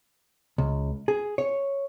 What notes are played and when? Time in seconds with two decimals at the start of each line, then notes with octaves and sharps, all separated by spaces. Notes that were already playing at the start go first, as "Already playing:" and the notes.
0.58 C#2
1.08 G#4
1.38 C#5